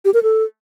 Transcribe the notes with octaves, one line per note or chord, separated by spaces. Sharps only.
G4
A#4
A4